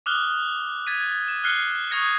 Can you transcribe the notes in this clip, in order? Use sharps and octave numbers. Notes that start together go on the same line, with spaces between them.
D6 D#6 F6 F#6 G7
G#6 A6 B6 D#7
E7
F6 F#6 C7 C#7 G7
C#6 D#6 F#6 G#6 A#6 C#7